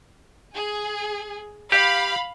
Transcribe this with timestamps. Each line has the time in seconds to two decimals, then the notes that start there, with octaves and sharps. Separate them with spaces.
0.52 G#4
1.72 G4 F5 B5